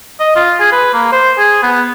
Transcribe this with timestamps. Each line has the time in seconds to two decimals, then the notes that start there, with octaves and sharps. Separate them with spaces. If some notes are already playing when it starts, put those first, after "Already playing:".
0.20 D#5
0.36 F4
0.60 G#4
0.72 B4
0.94 A#3
1.12 C5
1.38 G#4
1.63 B3